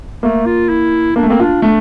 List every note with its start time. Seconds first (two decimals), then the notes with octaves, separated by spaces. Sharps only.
0.23 A3 A#3
0.46 F4
0.69 E4
1.16 A#3 D4
1.23 A3
1.29 A#3 C4
1.40 D4 F4
1.62 A3 D4